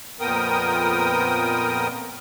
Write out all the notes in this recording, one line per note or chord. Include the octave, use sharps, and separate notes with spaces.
F2 A#2 B3 A#4 G5 D#6